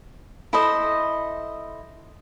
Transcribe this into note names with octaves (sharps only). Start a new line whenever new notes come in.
E4 A4 C5 D#5